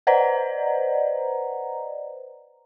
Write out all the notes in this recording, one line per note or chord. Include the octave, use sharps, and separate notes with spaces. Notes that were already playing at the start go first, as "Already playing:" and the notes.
B4 C5 D5 D#5 F#5 A#5